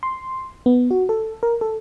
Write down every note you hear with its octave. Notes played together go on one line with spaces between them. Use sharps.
C6
B3
F#4
A4
A#4
A4